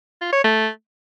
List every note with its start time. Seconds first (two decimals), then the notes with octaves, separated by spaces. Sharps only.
0.21 F4
0.32 C#5
0.44 A3